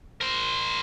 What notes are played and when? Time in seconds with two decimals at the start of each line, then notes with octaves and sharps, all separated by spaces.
0.21 A#4 C5